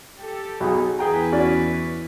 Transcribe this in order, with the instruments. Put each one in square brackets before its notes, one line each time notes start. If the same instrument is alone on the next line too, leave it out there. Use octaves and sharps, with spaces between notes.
[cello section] G4 A4
[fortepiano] B1 G#4
[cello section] E2 E4 B4 [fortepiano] G#4 G5 A#5
[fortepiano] C#4 F#4 D5